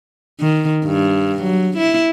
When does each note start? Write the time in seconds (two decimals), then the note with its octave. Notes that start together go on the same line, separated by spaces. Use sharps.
0.40 D#3
0.85 G2
1.42 F#3
1.77 E4